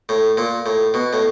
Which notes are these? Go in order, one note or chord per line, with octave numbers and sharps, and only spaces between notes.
A2
A#2
A2
B2
A2